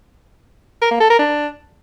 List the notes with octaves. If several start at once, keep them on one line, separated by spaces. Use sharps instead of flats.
A#4
A#3
A4
A#4
D4